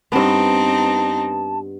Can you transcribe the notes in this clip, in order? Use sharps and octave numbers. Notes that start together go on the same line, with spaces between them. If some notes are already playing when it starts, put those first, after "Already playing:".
G2 B3 C4 D#4 A5